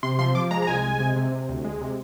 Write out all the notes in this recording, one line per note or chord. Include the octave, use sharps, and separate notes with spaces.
C3 C6
F3 C6
F3 D6
G#3 A#5
A#5
C2 G#5
G#3
C3
C3
C3
D2
G#3
C3